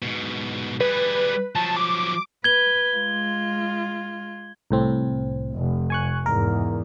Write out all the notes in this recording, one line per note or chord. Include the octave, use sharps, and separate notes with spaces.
G#2 B2
G3 G#4 B4
F3 F#3 A5
D6
B4 G#6 G7
G#3 F4
C2 A2 C4
F1
G#5 C#6 F#6
E2 G#2 A#4